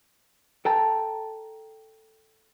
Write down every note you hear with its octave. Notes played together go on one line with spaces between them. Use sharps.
A4 G5 A5 A#5